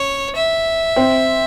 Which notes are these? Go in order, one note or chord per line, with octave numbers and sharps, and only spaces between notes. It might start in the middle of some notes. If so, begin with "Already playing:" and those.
Already playing: C#4 C#5
E5
C4